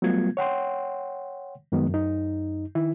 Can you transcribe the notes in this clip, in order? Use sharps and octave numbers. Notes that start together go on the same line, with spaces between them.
F#3 G3 A3 B3 F4 G#6
C#5 F#5 G5 C6
F#2 D#3 F#3 G#3 B3
F#2 D#4
D#3 E4